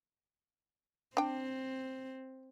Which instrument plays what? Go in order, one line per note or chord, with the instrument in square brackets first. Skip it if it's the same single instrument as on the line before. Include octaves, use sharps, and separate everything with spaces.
[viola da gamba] C4 [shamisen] D4 G5